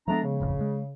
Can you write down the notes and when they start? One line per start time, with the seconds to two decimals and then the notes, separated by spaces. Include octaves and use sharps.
0.08 F3 G#3 A3 B3 D4 A#5
0.24 C#3
0.40 D#1 A1 F2
0.61 G#3